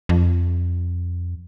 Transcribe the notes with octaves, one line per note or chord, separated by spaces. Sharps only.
F2